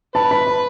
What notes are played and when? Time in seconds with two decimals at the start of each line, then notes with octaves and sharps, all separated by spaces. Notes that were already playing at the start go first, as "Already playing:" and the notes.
0.15 B4 A5
0.31 B5
0.47 B5